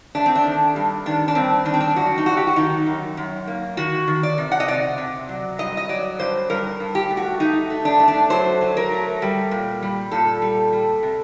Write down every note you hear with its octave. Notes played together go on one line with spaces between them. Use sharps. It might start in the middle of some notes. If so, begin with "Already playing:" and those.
A3 D4
C4
D4
D#3
G2
D#3 D4
D4
G2 C4
D#3 D4
C4
D4
F#2 F#4
D#4
F#2 F#4
G4
F#4
D#3 D#4
F#2
F#2
A#3
D#3 F#4
D#3
D5
C3
F#5
D#5
C3 D5
C3
F#3
G2 D#5
D#5
F#3 D5
G2 C5
G2 A#4
G2
G4
A3
F#4
A3 D#4
A3
D4
A3
D4
F#3 C5
F#3
A#4
A3
G3
A#2
G3
A#2 A4
G3
G3
C3